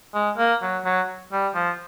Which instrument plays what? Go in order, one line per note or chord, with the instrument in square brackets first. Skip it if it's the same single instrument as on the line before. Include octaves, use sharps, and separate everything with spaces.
[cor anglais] G#3
A#3
F#3
F#3
G3
F3